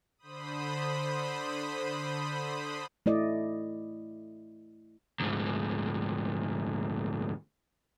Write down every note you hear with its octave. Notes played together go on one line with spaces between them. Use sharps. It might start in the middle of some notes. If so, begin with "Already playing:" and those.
D3 C5 B5 D#6
A3 E4 D5 D#5
D2 G#2